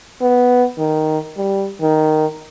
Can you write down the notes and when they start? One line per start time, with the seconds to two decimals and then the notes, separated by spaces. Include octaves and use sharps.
0.21 B3
0.78 D#3
1.37 G3
1.81 D#3